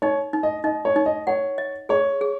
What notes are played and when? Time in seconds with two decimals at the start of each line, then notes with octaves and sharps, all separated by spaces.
0.02 D#4 C#5
0.33 D#4
0.43 D#5
0.64 D#4 D#5
0.85 C#5
0.96 D#4
1.06 D#5
1.27 C#5 F#5
1.58 D#5
1.89 G#4 C#5
2.21 G#4